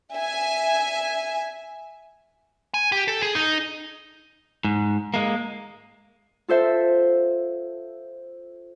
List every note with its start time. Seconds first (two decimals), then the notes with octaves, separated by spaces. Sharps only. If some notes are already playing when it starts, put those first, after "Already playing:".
0.13 E5 G#5
2.74 G#5
2.92 G4
3.08 A4
3.23 G#4
3.35 D#4
4.64 G#2
5.14 G#3 A#3
6.48 F4 A4 C5 E5